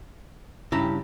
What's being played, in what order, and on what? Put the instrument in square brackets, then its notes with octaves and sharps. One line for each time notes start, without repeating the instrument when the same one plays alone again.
[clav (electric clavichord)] G2 A5 [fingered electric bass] C#3 [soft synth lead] C#4 [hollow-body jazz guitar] E4 G4 A#5